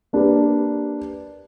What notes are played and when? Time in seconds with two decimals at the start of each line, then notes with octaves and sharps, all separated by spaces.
0.13 A#3 D4 G4 B4